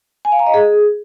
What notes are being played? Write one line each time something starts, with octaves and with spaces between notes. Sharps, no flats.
G#5
F5
A#5
D#5
G#4